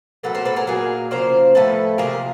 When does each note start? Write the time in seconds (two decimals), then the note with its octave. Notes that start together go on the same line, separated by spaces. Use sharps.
0.23 A2 F#3 A#3 A4 B4
0.34 A#4 C5
0.45 A4 B4
0.56 G#4 A#4
0.67 A#2 F#3 A#3 G#4 A#4
1.11 C#3 F3 A#3 A#4 C5
1.55 A2 F3 A3 A4 B4
1.98 C3 F3 A#3 G#4 A#4